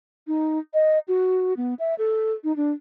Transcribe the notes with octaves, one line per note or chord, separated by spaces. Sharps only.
D#4
D#5
F#4
B3
E5
A4
D#4
D4